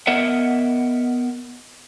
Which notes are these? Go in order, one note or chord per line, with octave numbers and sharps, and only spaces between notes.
B3 A#4 D#5 E5 F#5